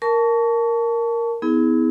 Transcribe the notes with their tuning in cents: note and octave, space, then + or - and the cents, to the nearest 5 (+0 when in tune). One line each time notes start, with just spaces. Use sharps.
A#4 +0 A5 +0 C#6 +30
B3 +25 E4 -40 G#4 +0